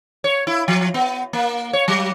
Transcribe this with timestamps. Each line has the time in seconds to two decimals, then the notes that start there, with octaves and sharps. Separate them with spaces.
0.24 C#5
0.47 E4
0.68 F3
0.94 B3
1.33 A#3
1.73 C#5
1.88 F#3